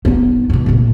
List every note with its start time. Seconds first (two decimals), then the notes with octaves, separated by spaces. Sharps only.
0.05 B3 D#4
0.50 G#2 B2
0.66 C2 A#2